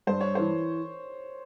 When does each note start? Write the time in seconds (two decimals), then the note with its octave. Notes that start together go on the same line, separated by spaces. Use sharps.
0.07 G2 C5
0.21 C#5
0.35 E3 C5